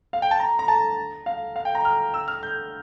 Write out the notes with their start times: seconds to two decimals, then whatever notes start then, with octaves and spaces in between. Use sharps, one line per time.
0.13 F5
0.22 G5
0.31 A5
0.40 A#5
0.59 A#5
0.68 A5
1.26 F5
1.56 F5
1.65 G5
1.75 A#5
1.85 F6
2.14 E6
2.28 F6
2.43 G6